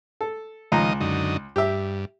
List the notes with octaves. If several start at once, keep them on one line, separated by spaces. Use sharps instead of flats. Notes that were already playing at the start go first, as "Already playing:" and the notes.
A4
C#2 D#3 F3 D#5 A#5
F#2 D3 D#4
G2 G4 E5